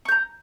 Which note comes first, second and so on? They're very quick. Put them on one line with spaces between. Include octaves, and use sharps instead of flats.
C#6 G6 A#5